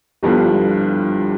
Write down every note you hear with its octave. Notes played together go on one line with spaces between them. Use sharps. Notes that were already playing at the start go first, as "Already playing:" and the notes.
G1 G2 D3 F3 B3 E4 G4
D4 F4
G3